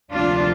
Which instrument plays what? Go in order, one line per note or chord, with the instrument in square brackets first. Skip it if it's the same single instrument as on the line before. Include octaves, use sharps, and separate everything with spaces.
[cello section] D2 C3 F3 A#3 D4 F4